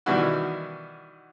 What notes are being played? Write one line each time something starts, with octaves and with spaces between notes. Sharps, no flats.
B2 D#3 E3 G3 E4 F#4